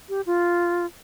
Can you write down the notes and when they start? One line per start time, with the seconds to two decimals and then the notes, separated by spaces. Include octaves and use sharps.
0.09 G4
0.26 F4